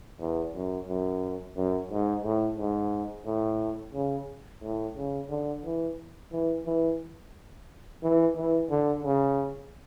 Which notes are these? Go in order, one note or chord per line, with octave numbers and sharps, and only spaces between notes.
E2
F#2
F#2
F#2
G#2
A2
G#2
A2
C#3
A2
C#3
D3
E3
E3
E3
E3
E3
D3
C#3